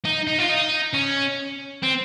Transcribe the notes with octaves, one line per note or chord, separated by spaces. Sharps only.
D#4
D#4
F4
D#4
C#4
C4